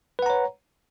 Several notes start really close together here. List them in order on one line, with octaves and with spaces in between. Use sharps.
B4 F#5 A#5 C#5